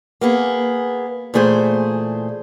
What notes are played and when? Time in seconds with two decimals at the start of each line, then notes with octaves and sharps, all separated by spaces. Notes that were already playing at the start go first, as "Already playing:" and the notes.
0.21 A#3 B3 G#4
1.34 A#2 E3 A3 G#4 A4 C5